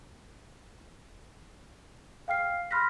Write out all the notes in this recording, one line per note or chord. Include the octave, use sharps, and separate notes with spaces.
F5 G5 F6 C7
B5 C6 F6 F#6 A#6 B6